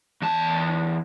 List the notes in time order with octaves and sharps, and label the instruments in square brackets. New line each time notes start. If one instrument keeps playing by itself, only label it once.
[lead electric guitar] E2 A5